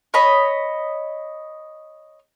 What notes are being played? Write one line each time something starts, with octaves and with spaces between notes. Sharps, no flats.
C#5 D#5 B5